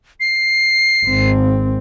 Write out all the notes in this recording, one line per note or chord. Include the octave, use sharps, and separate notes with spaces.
C7
G#1 C4